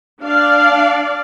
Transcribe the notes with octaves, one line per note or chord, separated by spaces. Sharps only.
D4 D5 F5